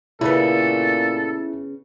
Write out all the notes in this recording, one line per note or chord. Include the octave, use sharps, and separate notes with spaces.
A#2 C#3 B3 E4 A4